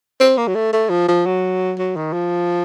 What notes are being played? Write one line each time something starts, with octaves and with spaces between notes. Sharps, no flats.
C4
A#3
F#3
A3
A3
F3
F3
F#3
F#3
D#3
F3